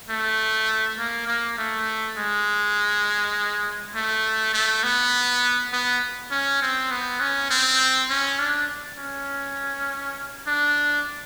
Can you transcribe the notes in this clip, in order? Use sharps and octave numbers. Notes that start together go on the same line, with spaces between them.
A3
A#3
A#3
A3
G#3
A3
A3
B3
B3
C#4
C4
B3
C#4
C4
C#4
D4
C#4
D4